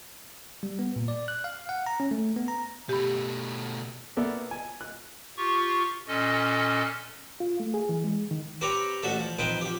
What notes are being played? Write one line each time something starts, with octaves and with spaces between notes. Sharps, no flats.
G3
B3
A#2
D5
F#6
F5
F#5
A#5
C#4
A3
B3
A#5
B2 A3 G4 B5
A#3 B3 A4 D5 E5
G#5
F#6
F4 G4 C#6
A#2 C#4 A4 D#5
F4
A3
G#4
E3
G#3
D#3
C4 G4 B4 C#5 A#5
A1 F#4 A4 E5
F3
F2 D#4 B4 C5 G5
F3 G4